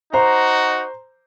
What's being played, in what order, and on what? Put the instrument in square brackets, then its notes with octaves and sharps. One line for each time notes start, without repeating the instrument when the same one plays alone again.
[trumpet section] D#4 F#4 [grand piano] C5 A#5